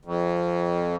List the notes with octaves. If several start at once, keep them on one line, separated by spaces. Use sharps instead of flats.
F2